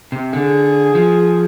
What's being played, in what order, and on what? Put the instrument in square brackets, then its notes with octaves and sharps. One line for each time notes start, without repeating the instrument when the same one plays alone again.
[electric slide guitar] C3
[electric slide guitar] D3 [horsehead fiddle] G#4
[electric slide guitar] F3